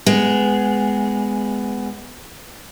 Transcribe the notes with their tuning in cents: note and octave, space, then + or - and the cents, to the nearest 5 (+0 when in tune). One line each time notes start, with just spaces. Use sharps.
G#3 +0 B3 +15